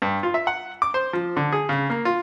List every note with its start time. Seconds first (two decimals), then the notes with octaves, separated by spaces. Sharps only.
0.02 G2
0.23 F4
0.34 E5
0.47 F#5
0.82 D6
0.94 C5
1.13 F3
1.37 D3
1.53 G#4
1.69 C#3
1.90 A#3
2.05 F4